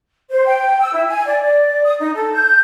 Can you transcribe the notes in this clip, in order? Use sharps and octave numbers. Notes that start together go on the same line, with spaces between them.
C5
G5
E6
E4
G#5
D5
D5
D#6
D#4
A4
G6